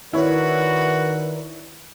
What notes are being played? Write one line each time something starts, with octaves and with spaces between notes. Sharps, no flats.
D#3 E4 F#4 A#4 B4 C#5 D5